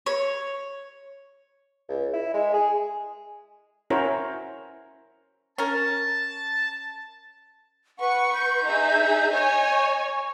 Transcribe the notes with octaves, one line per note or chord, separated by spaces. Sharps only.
C#5
C#2
E4
G#3
G#4
C#4 E4 F#4 A#4 C5 C#5
C#4 A#4 A5
B4 F#5 C#6
G6
D#4 G#4 E5
C#5 D#5 G#5
C#6